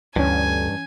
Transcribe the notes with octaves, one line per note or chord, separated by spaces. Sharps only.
D2 G2 E3 C#4 G#5